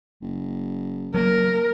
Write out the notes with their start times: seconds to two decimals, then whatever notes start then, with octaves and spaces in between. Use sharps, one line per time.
0.22 F#1
1.14 F#3 A#3 A#4